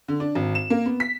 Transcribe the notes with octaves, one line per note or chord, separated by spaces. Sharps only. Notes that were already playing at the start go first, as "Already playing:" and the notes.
D3
D4
G#1
E7
A#3
B3
B6